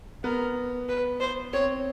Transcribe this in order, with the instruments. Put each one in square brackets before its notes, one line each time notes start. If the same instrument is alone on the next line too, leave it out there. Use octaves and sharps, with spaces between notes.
[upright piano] B3 [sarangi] A#4
[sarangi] B4
C5
[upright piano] C4 [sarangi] C#5